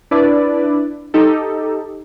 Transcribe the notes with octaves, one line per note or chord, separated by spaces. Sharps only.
D4 E4 B4 D5
D#4 G4 A4